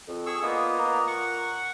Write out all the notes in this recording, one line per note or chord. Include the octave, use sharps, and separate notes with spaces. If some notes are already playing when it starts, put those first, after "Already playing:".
F2
G#4 C#6 E6
A#3 B3 D4 F4 D#5
A#2 A#5
F#5 C#6